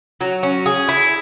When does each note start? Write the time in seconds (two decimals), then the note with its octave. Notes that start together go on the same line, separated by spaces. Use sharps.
0.21 F#3
0.43 C#4
0.66 G#4
0.89 E4